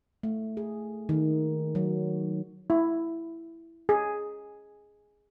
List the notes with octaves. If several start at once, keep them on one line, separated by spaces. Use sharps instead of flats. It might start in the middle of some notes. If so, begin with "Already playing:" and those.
A3
G#4
D#3
F#3
E4
G#4